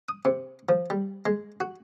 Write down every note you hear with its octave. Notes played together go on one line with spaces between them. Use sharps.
D#6
C3
F3
G3
G#3
F#4